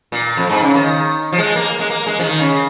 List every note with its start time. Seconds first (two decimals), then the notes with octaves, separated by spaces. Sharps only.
0.12 A#2
0.37 F2
0.50 G#2
0.62 C#3
0.75 D#3
1.33 F3
1.38 G#3
1.56 A#3
1.79 G#3
1.90 A#3
2.07 G#3
2.19 F3
2.23 D#3
2.39 C#3